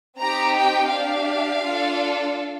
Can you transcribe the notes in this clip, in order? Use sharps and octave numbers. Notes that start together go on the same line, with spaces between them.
C4 D#4 G4 A#5
G5
D4 G4 F5
D4 F4 A4